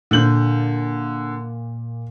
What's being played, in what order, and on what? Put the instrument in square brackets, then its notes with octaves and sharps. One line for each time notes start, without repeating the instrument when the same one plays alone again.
[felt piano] A#2 G6 [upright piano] D3 F#7